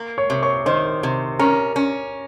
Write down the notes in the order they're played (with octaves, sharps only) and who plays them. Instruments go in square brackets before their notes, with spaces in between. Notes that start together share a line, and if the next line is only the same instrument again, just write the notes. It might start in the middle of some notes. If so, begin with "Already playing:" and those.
Already playing: [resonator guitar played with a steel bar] A#3
[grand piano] C#5 C#6
[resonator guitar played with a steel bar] C3
[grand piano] C#5 C#6
[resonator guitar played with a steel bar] D#3 [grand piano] C5 C6
[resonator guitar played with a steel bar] C3
[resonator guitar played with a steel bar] C#4 [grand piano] A#4 A#5
[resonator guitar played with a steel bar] C#4